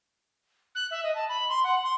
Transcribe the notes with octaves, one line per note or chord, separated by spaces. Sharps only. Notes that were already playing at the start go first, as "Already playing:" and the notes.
F#6
E5
D#5
A5
B5
C6
F#5
C6